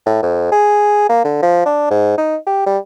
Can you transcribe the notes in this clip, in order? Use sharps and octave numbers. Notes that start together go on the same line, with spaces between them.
A2
F2
G#4
A#3
D3
F3
D4
G#2
D#4
G4
G3